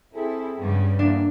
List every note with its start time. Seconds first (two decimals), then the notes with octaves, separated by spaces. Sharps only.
0.14 C4 E4 G#4 A4
0.58 G2 C#3 G3 B3
0.99 E2 A#3 D4